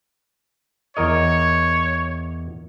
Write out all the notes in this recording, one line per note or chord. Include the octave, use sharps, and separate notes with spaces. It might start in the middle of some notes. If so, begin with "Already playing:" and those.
E2 A#4 C#5 D#5